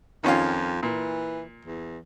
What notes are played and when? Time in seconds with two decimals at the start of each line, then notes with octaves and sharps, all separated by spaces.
0.24 F2 D#3 C#4 F4
0.83 A#2 E3
1.66 E2